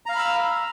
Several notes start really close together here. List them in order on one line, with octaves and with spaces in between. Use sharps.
A#5 F5 F6 B5 E6